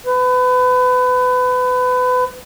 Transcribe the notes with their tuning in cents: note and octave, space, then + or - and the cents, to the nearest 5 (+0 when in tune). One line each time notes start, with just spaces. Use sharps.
B4 +30